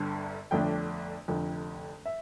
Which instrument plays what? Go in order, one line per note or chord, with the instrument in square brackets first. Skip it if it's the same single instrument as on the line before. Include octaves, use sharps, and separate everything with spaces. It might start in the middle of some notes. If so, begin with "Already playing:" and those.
Already playing: [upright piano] G1 G2 D3
G1 F2 D3 A3 D4 G5
F1 F2 D3
E5